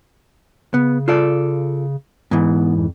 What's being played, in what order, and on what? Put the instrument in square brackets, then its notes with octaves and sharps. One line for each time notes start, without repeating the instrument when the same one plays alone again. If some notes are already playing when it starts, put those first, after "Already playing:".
[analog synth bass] C#3 [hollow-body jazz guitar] B3
[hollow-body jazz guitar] F4 A4 D5
[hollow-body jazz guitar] G#2 E3 [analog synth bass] B3
[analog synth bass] F2